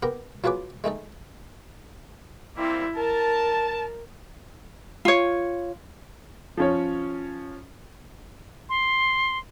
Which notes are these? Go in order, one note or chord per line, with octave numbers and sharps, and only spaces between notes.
B3 G4 A#4
F#3 F4 G#4 B4 D6
G#3 A3 D#4 A4
G3 A#3 C4 E4
A#4 A5
F4 C#5
F3 C#4 C#5
C6